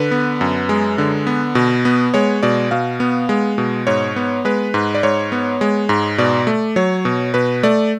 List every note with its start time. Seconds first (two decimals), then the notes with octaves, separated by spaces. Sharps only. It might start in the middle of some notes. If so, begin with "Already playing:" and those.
Already playing: D3 B4
0.11 B3
0.41 F#2
0.69 G#3
0.98 D3
1.27 B3
1.55 B2
1.85 B3
2.14 G#3 C#5
2.43 B2 D5
2.71 B2 F5
3.00 B3
3.29 G#3
3.58 B2
3.87 G#2 C#5
4.16 B3
4.45 G#3 B4
4.74 G#2
4.95 D5
5.03 G#2 C#5
5.32 B3
5.61 G#3
5.89 G#2
6.18 B2 D5
6.47 A3
6.76 F#3 C#5
7.05 B2
7.34 B2 B4
7.63 A3 D5